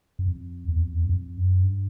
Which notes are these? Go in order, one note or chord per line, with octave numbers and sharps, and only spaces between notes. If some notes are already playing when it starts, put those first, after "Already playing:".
F#2
F2
E2
F2
E2
F#2
F2
F#2
G2